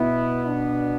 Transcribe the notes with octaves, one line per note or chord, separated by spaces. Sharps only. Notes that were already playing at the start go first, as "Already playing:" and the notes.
Already playing: B2 B3 E4
D4